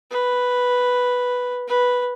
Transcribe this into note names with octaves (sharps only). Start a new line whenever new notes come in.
B4
B4